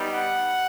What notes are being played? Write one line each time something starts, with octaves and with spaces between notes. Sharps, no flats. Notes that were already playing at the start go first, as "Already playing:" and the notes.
Already playing: G3 B3 D#4
F#5